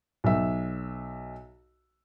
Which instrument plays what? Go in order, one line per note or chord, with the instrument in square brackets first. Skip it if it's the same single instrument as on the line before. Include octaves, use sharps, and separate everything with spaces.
[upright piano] B1 E5